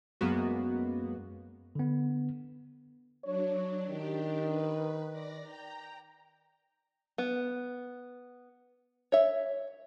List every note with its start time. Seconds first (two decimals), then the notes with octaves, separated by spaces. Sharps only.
0.21 F#2 G#3 A#3 B3 F#4
1.75 D3 B3
3.24 F#3 D4 C#5
3.87 D#3 D4 G4
4.45 B4
5.11 D5 A#6
5.41 G5 A#5
7.18 B3
9.12 C#5 E5